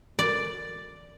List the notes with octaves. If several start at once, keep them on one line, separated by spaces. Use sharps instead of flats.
D5